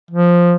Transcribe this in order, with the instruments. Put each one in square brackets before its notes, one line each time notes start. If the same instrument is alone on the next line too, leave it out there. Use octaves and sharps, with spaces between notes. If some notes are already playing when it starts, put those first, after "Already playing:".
[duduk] F3